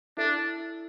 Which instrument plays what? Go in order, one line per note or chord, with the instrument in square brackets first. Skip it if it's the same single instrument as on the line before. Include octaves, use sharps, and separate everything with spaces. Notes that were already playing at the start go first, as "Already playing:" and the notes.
[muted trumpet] D4 [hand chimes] E4 A4 E5